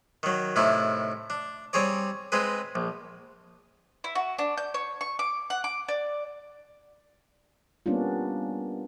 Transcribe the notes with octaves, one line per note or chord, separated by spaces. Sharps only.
D#3 F#3
A2 C3 D#3 E4
D4
G3 C4 G#4 C#5 D5
G#3 C4 G#4 B4
A#1
E4
F#4
D4
G6
C#5
C#6
D6
F#5
D6
D5
G3 A#3 B3 C#4 D4 F4